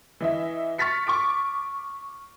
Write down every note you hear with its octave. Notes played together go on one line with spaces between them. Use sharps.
E3 D#5 E5
C#6 F6 A6 B6 C#7
C#6 D6 D7